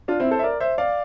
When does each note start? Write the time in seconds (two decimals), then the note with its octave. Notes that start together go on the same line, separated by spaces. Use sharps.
0.08 D4 F4
0.20 C4 E4
0.31 A4 C5
0.39 E5
0.43 A#4 D5
0.60 C5 E5
0.78 D5 F5